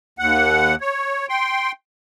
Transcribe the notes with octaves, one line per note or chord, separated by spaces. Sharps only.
D#2 F#5
C#5
G5 C6